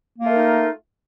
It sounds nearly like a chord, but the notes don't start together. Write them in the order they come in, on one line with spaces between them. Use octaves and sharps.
A#3 F4 A3 A#4 D#4